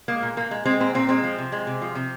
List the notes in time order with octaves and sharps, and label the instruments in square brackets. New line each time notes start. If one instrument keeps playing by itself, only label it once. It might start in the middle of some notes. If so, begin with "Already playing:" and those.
[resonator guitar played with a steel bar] G#3 A#3
A#2
A#2 A#3
G#3
G#3 C4
A#2 C4
A#2 C4
G#3 C4
F3
C3
G#3
C3
F3
C3